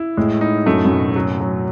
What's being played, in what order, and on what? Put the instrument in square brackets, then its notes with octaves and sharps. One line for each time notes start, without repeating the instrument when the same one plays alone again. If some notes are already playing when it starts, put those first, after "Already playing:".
Already playing: [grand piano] E4
[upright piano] A2 [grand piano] G#3
[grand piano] D#4
[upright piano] F#2 [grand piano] A3
[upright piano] F#2
[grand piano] B2
F#3
F#3